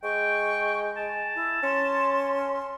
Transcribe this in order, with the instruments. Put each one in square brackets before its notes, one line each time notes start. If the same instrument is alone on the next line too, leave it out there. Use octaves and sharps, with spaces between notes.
[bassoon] G#3 [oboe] G5 [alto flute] C#6
[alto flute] G#5 [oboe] A5
[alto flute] E4
[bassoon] C#4 [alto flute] C6